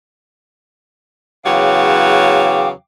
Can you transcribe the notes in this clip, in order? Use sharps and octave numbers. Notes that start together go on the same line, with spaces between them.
E2 C#3 F#3 F5 G5 D6